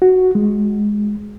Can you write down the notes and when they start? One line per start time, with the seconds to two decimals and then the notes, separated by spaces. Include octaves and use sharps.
0.02 F#4
0.35 G#3